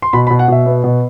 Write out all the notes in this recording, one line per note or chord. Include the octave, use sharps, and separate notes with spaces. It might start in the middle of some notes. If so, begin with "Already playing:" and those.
C6
B2 B5
B5
B2
F#5
B2 E5
B3
B2